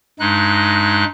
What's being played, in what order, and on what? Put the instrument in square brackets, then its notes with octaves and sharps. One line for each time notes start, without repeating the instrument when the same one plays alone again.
[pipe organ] G2 G#3 D#4 F#6